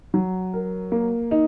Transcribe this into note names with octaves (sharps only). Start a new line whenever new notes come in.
F#3
A#4
A#3
D#4